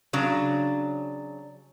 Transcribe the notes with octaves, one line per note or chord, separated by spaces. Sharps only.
C#3 F#3 D4